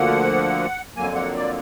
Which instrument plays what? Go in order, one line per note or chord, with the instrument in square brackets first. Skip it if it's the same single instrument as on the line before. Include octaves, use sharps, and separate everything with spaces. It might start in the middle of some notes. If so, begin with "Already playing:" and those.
Already playing: [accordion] D2 D3 F3 A#3 F#5
F2 D3 F#3 A#3 G#5
F#5
D5